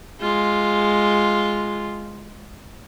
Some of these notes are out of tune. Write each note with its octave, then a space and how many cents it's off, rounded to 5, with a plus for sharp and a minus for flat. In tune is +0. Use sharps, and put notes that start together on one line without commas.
G#3 +0 F4 +0